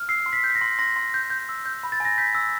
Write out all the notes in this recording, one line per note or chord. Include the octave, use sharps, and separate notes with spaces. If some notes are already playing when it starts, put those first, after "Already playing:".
Already playing: F6
E6 C7
C6
B6
G6
B6
A#6
C6
C6 A#6
C6
G6
G6
E6
G6
B5
A6
G#5 A#6
G6 B6
E6